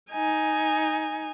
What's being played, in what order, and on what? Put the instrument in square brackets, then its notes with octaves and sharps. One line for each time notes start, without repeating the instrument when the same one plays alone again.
[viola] D#4 G#5